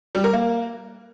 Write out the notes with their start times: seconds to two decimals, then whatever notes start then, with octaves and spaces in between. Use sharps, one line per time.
0.15 G3
0.24 A#4
0.33 A#3